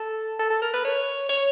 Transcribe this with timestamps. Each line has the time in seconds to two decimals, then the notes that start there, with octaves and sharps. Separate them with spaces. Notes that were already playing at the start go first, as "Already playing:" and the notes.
Already playing: A4
0.39 A4
0.50 A4
0.62 A#4
0.73 B4
0.85 C#5
1.29 C#5